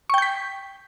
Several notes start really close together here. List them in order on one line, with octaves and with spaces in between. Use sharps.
C#6 G5 G6 B6